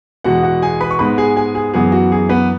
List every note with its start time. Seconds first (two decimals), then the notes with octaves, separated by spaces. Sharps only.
0.24 E2 B2 G#3 B3 F#4 F#5
0.43 F#4 F#5
0.62 G#4 G#5
0.81 B4 B5
0.91 C#6
0.99 G#2 G#3 B3 B4 B5
1.18 G#4 G#5
1.36 G#4 G#5
1.55 G#4
1.74 F#2 E3 B3 G#4
1.92 F#4
2.12 G#4
2.29 B3 B4